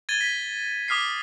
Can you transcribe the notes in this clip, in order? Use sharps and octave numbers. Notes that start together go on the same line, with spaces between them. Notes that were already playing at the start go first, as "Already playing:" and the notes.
G#6 A6 D#7 G7
B6
D6 D#6 F6 B6 C7